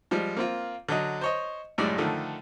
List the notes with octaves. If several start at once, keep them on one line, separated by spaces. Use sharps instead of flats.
F3 G3 G#3
A#3 C4 F4
D3 F#3 D#5
C5 C#5 D#5
G#1 F#2 A2 G3 G#3 D5
D3 D#3 F3 A3